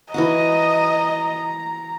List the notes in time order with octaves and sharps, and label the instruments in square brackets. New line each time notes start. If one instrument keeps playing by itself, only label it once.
[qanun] E3 F#4 F#5 [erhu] D#5 [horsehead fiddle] A#5